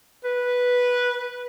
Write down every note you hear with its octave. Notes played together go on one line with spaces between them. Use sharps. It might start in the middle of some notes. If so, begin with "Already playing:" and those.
B4